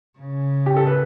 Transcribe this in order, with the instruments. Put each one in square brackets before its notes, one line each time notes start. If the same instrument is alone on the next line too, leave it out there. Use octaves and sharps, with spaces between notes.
[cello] C#3
[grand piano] G4
A4
B4